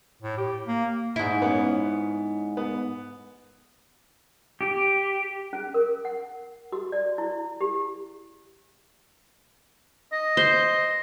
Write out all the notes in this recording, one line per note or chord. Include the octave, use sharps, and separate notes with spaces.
A2
G4
A#3
G#2 E4
B3 C#4
B3
G4
C#4
A#4
F#5
F#4
D5
E4
G4
D#5
C5